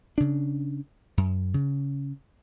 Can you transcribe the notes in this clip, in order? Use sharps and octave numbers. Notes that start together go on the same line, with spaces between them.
C#3 D4
F#2
C#3